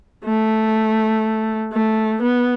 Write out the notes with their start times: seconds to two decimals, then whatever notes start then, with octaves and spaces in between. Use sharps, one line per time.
0.25 A3
1.73 A3
2.22 B3